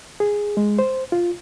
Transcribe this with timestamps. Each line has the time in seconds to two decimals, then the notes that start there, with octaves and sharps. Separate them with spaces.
0.20 G#4
0.57 G#3
0.79 C5
1.12 F4